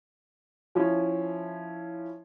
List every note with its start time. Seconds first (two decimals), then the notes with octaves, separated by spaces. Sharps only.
0.75 F3 C#4 E4